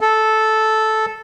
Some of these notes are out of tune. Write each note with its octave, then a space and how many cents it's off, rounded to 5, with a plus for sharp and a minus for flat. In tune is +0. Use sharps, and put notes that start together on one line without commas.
A4 -10